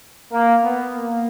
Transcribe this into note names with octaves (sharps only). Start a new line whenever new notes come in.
A#3
B3
A#3